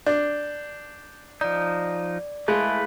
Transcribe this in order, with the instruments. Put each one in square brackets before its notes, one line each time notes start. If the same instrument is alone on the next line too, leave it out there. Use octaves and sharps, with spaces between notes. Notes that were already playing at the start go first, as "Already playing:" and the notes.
[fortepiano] D4 [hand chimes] G6
[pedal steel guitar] F3 D#4 [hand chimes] D5
[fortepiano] G#3 [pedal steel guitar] A3 E4 B4 [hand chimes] G#4 F5